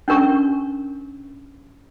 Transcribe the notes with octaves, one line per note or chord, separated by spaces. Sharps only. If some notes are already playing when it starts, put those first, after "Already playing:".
C#4 D4 A#4 C#6